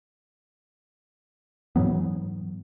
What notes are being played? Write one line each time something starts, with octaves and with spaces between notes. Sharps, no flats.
G#2 E3 F#3 B3